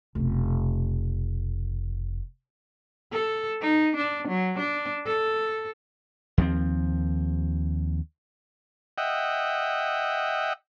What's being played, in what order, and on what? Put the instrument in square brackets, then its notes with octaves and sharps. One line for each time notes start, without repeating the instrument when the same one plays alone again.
[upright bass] F1 B2
[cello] A4
D#4
D4
F#3
D4
A4
[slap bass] D#2 F3 C4
[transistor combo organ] D#5 E5 F#5 G5